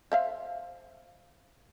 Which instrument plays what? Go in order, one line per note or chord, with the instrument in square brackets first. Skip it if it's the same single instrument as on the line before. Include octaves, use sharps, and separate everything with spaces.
[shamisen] C5 E5 F5